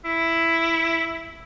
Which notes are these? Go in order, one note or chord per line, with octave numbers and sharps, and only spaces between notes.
E4